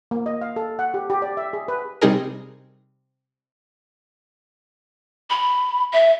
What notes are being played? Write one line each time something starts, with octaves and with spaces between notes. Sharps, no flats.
A#3
D#5
F5
A4
F#5
G4
G4
D5
E5
G#4
B4
C3 G3 D#4 G#4 A#4
B5
E5